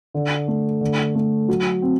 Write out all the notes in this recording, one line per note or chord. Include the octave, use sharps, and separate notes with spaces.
D3
A3
D3
A3
F#3
C4